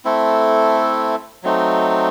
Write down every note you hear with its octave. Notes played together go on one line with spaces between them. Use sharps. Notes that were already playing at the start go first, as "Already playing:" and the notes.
A3 C4 E4 A4
F#3 A3 C4 D#4